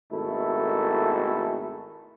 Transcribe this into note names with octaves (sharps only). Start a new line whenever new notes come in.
G#1 B2 A3 E4 A4